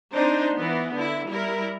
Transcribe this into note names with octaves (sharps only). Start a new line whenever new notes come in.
C4 D4 D#4 C5
E3 B3
D3 E4
G3 E4 A#4